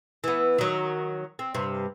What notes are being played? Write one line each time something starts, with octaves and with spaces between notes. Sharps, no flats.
E3 B3
D#3 F#3
C4
G2 C3